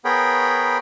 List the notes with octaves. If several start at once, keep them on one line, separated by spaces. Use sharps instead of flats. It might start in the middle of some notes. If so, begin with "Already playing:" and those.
B3 G#4 A#4 C#5 G5 B5